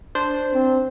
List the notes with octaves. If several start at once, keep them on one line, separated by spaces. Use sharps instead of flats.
D4 C5
C4